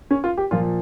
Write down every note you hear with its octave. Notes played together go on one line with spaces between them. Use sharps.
C#4
F4
G4
A#2 F3 F4